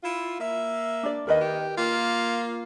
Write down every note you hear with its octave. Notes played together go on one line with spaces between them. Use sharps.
E4 F4
A#3 E5
D4 D5
D#2 D#3 A#4 B4 D#5
G4
A#3 F4